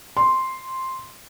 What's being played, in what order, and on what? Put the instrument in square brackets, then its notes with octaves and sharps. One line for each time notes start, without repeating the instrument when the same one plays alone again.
[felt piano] C6